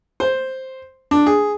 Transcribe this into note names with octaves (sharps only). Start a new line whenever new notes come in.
C5
D4
G#4